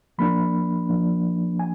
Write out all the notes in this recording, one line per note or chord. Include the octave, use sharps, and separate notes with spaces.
F3 A#3 D4 B5
F3 A#3 D4
G#5